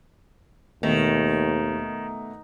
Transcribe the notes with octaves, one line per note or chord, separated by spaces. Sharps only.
D#2 B2 D#3 A3